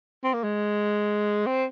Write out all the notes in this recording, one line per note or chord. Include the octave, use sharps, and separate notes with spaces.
C4
A#3
G#3
C4